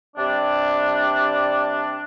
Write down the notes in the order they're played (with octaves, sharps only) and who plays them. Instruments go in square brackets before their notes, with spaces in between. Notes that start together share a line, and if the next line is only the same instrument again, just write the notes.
[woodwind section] C3 G3 D4